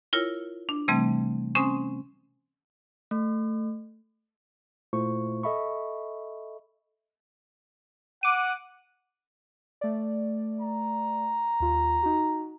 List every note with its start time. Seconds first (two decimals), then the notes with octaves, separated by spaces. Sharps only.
0.13 E4 F4 A#4 C#5
0.69 D4
0.88 C3 E3 G3 A3 C4
1.55 C4 C#4 C5 G#5 C6 D#6
3.11 A3
4.93 A#2 A3 E4 F4 C5 C#6
5.43 A4 D#5 E5 B5 C#6
8.23 F#5 D6 D#7
9.81 A3 D5
10.61 A#5
11.60 D#2 F4
12.03 D#4 F#4